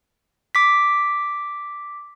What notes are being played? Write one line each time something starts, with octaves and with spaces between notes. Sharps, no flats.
D6 B6